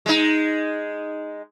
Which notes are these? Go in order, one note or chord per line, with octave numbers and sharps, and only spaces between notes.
G#3 D#4